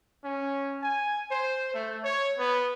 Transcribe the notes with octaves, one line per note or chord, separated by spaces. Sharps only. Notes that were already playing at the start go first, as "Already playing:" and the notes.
C#4
G#5
C5
A3
C#5
B3